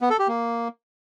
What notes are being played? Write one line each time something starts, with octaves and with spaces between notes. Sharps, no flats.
B3
A4
G4
A#3